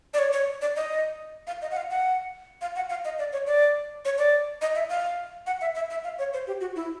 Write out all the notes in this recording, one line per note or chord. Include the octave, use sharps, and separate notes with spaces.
D5
C#5
C#5
D5
D#5
F5
D#5
F#5
F5
F#5
F5
F#5
F5
D#5
D5
C#5
D5
C#5
D5
D#5
E5
F5
F#5
E5
E5
E5
F5
C#5
C5
G4
F#4
E4